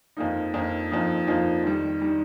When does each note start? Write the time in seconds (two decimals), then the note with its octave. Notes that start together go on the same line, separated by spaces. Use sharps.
0.17 F2 F3 A#3 D#4
0.54 F2 F3 A#3 D#4
0.91 F2 F3 A#3 D#4
1.27 F2 F3 A#3 D#4
1.64 F2 D#3 G3
2.01 D#3 G3